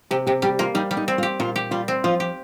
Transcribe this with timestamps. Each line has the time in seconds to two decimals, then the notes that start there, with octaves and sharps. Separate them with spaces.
0.11 C3 G4
0.27 C3 G4
0.42 G3 G4
0.59 A#3 F4
0.75 G3 D#4
0.91 G3
0.97 D#4
1.08 C4
1.18 F4
1.23 G4
1.40 A#2 F4
1.56 G4
1.71 G3 F4
1.88 C4
2.04 F3 F4
2.20 G4